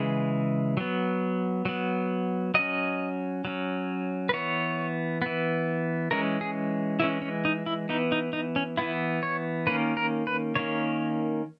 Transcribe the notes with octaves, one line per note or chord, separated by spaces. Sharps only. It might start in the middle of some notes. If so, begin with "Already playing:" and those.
Already playing: C#3 E3 G#3
F#3 B3
F#3 B3
F#3 C#4 D#5
F#3 C#4
B4
E3 B3 C#5
E3 B3
E3 G#3 C#4 A#4
G#4
E3 G#3 C#4 E4
C#4
D#4
E4
E3 B3 D#4
D#4
D#4
C#4
E3 B3 E4
C#5
D#3 A#3 C#4 B4
A#4
B4
D#3 A#3 C#4 C#5